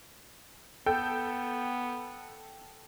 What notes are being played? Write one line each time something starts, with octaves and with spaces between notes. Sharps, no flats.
B3 A4 G5 G6